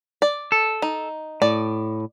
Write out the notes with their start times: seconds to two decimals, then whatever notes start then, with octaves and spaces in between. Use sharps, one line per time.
0.22 D5
0.52 A4
0.82 D#4
1.42 A2 D5